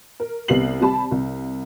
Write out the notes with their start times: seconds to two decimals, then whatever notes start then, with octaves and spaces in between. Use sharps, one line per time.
0.20 A#4
0.48 C2 B3 G4 C7 F#7
0.80 C3 G3 G4 A5 B5
1.11 C2